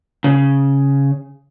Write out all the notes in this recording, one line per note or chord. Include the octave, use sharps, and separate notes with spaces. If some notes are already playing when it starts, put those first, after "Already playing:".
C#3